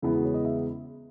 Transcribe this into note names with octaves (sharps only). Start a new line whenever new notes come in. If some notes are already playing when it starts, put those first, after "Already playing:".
E2 C#3 G#3 B3 E4
F#4
C#5
D#5
E5